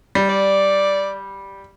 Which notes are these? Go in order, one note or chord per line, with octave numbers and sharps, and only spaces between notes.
G3
D5